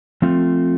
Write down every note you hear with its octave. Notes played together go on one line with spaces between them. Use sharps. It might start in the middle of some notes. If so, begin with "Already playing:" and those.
F3 A3 C4 F4